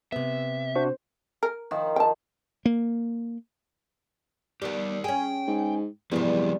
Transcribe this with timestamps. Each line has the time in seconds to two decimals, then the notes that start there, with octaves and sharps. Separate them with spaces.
0.12 C3 B3 E5
0.75 D4 F#4 C5
1.43 A#4
1.71 D#3 F3
1.96 G5 A5
2.65 A#3
4.62 G3 B3 G4 A#4
5.04 C#4 G#4 G5
5.47 G#2
6.12 E2 C3 F3 G3 G#3 B4